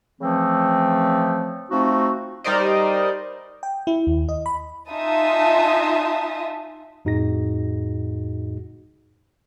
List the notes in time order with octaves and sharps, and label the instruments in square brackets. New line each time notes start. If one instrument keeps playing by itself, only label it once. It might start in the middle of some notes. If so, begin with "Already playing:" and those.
[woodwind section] C#3 E3 F3 A3 C4
F3 A3 C4 D#4 F#4
[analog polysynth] G3 D#4 A#4 C5 D5 D#5
[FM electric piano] G5
E4
D#2
D#5
B5
[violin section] D#4 F4 E5 G#5 A5 D#6
[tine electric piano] F2 A2 D#4 F#4 G#4 A#6